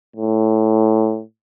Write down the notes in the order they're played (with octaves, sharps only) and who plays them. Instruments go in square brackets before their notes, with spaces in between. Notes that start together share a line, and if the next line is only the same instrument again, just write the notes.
[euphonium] A2